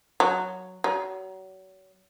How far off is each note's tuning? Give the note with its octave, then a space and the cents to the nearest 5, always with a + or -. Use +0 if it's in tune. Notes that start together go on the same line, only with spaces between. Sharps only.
F#3 +0
F#3 +35